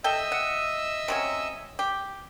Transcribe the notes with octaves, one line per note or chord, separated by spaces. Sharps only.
A4 D#5 E5 G5 E6
F#5
C3 F#3 C#4
G4